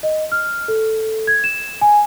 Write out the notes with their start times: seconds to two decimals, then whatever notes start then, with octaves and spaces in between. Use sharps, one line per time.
0.03 D#5
0.32 F6
0.68 A4
1.27 G#6
1.44 E7
1.81 G#5